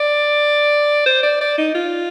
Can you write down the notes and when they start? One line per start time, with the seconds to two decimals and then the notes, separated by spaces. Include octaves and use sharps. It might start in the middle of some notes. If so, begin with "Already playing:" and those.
Already playing: D5
1.06 C5
1.23 D5
1.41 D5
1.58 D#4
1.75 F4